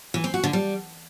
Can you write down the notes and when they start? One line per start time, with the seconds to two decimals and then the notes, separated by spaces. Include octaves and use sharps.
0.14 E3
0.24 C4
0.34 F#4
0.44 D3
0.53 G3